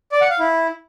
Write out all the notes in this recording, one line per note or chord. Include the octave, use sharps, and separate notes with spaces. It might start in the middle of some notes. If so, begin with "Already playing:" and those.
D5
F#5
F5
E4